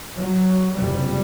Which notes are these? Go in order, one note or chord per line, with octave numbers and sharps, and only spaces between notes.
F#3
F#1 F2 C3 G3